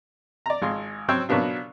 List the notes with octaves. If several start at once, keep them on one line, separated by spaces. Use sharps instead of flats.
D5 A#5
G#1 G#3 F4 C6
F#3 C4 C5 C#5 G5 E6
B2 F#3 A#3 B3 D4 F4